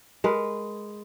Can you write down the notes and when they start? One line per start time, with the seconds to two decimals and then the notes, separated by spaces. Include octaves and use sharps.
0.24 G#3 A#4 B4